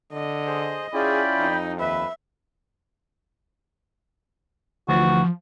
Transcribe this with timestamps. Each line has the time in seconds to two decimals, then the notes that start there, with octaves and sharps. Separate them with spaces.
0.13 D3 D#5
0.47 G#4 C5
0.94 C#4 E4 F4 G#4 D5 G5 B5
1.39 F2 D#4
1.80 D#2 B4 E5
4.89 D2 E3 F3 F#4